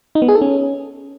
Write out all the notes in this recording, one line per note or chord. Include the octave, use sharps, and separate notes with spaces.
D#4
B3
G#4
A4
C#4